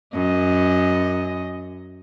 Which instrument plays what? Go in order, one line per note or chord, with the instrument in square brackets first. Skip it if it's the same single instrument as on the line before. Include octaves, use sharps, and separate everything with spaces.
[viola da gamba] F#2 D#5